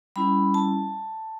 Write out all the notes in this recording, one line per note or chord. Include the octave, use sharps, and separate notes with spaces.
G3 C#4 E4 B5
A5